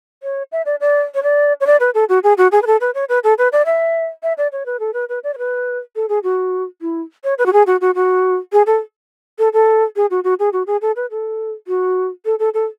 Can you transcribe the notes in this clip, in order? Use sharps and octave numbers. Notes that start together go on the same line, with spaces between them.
C#5
E5
D5
D5
C#5
D5
C#5
D5
B4
A4
F#4
G#4
F#4
G#4
B4
A4
B4
C#5
B4
A4
B4
D5
E5
E5
D5
C#5
B4
A4
B4
B4
D5
C#5
B4
A4
G#4
F#4
E4
C#5
B4
F#4
G#4
F#4
F#4
F#4
G#4
A4
A4
A4
G#4
F#4
F#4
G#4
F#4
G#4
A4
B4
A4
F#4
A4
A4
A4